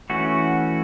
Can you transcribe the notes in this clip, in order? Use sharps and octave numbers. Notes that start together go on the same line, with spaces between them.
E3 A3 C#4 F#4